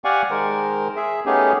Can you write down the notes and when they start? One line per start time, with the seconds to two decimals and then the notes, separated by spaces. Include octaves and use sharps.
0.04 G4 D5 F5 F#5 G#5 C#6
0.31 D#3 G#3 A#4 C5
0.96 G#4 E5
1.26 A3 B3 C#4 D#4 G4 G#4